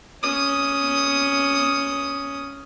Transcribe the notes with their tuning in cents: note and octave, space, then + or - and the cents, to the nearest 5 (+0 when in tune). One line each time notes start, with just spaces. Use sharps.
C#4 +10 D#6 +5